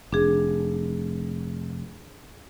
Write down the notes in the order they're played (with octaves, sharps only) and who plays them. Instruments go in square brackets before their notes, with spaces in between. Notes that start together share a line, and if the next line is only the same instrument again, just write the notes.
[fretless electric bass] F1 [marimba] D4 G#4